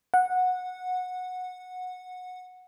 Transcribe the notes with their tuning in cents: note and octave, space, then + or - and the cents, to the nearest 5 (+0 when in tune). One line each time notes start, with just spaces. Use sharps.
F#5 -15